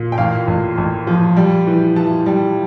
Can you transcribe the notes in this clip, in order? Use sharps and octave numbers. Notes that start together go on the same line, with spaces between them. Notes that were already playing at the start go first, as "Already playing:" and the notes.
Already playing: A#2
G5
A1 F5
A1
A1
F3
G3
E3
E3 A5
G3